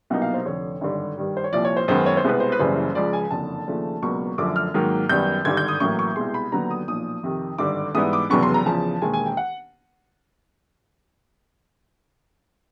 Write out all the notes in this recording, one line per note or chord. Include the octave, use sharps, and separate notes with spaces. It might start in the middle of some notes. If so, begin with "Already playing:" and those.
C2 B2 F#3 A#3 D#4 F#5
F5
C5
F1 F2 D3 C#5
G#1 G2 D3 G3
G2 D#3 G3
C5
C#5
C2 A#2 F3 D5
C#5
C5
F#2 D#3 G#3 B3 C5
C#5
C5
C2 B2 G#3 B3 B4
C5
B4
F#1 F#2 C#3 E3 G3 C5
C#2 C#3 F3 G#3 D5
G#5
F#1 F2 D3 A5
D#2 C#3 F3 A3 D4
C#2 B2 F#3 A#3 D4 C#6
F#2 D3 F3 A3 D6
F6
G#2 D#3 F#3 A#3
F#2 D#3 G3 B3 G6
G#1 G2 D3 G#6
G6
D#6
A1 A2 F#3 A#3 C#6
C#6
C2 B2 G#3 C6
B5
D#2 D3 F#3 B3 A#5
D#6
B1 A#2 F3 D#6
F2 C3 D#3
G#1 G2 D3 G3 D6
G#2 E3 G3 B3 E4 D#6
D6
F1 E2 C#3 F#3 B3 C#6
C6
A#5
E2 C#3 F3 A5
E1 D#2 D#3 G#3 G#5
G#5
G5
F#5